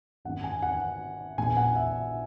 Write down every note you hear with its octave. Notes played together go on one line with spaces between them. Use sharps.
G#1 F#2 D#3 A#3 F#5
G#5
F#5
A#1 A#2 G#3 B3 G#5
F#5
E5